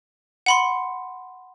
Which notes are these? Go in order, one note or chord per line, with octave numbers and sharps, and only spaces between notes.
F#5 B5 C6